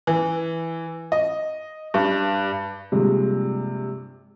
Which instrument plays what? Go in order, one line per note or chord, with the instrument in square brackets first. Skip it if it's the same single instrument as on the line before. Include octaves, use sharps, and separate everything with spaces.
[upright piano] E3
D#5
G2
A#1 G2 C3 G#3